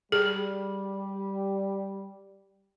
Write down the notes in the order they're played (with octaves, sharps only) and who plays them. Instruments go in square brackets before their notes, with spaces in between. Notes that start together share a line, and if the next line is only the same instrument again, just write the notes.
[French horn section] G3 [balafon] G#4